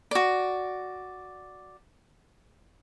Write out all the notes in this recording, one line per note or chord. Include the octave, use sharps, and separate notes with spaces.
F#4 D5